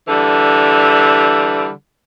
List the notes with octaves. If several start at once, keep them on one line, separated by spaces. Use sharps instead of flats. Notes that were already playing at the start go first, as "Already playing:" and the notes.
D3 E3 G3